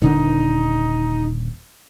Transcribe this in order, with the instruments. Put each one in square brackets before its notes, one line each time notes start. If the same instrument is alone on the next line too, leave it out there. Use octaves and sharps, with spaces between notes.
[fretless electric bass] D#1 D3 D4 [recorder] D#4